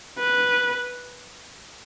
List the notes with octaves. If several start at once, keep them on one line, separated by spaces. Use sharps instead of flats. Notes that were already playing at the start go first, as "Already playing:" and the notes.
B4